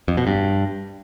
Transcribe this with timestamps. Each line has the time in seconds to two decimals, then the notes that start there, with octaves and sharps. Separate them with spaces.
0.08 F2
0.17 B2
0.27 G2